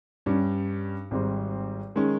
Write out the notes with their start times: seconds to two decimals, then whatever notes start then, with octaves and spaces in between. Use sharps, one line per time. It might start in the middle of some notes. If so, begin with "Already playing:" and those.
0.26 G2 G3 C#4
1.11 G#1 G#2 G3 C4
1.95 D#3 G#3 C#4